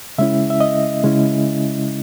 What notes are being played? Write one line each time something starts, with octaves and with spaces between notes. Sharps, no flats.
C#3 G#3 C#4 E4 E5
E5
D#5
C#3 G#3 C#4 E4